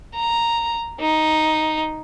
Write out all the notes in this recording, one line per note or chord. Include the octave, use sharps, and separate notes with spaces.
A#5
D#4